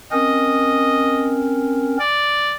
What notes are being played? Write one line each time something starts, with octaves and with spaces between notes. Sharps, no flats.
C4 C#4 A#4 D#5
D5